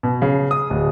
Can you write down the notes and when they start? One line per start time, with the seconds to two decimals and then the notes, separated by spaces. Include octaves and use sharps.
0.03 B2
0.22 C#3
0.51 D#6
0.70 D1